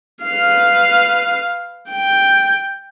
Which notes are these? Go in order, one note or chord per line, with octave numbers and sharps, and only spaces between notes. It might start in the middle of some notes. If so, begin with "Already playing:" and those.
B4 F5
G5